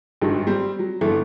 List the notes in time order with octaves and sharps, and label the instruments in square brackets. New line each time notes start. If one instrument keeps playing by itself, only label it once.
[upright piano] G#1 G2 D#3 F#3
G3 C4
F#3
G1 E4 A4